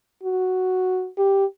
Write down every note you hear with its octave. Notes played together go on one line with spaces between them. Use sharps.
F#4
G4